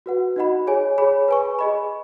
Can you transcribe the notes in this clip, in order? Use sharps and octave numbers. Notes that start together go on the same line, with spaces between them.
F#4 B4 F#5
D#4 F#4 D#5 F#5 B5
G#4 C#5 G#5
G#4 C#5 B5
B4 G#5 C#6
G#4 D#5 B5